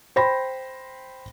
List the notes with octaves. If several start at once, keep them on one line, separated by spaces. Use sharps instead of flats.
C5 G5 B5 A#6